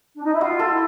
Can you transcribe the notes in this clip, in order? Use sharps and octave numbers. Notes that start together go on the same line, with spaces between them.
D4
D#4
E4
F4 F#4
A4
E4